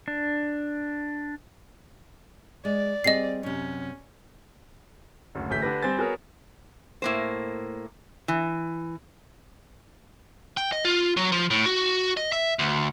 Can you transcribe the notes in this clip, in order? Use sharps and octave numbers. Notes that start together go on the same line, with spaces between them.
D4
G#3 D5
G3 C4 G#4 D#5 C7
F#2 C3 C#4
F#1 D2
D1 E3 A3 C#4 G6 B6
D3 D4 G4 B4 A#6
G3 C4 C5 G#5 A6
B3 F#4 G#4 A#4 C#5
A2 A#3 C5
E3
G5
D#5
F4
F#3
F3
A2
F#4
D#5
E5
D2